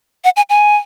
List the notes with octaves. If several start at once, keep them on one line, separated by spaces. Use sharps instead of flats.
F#5
G#5
G#5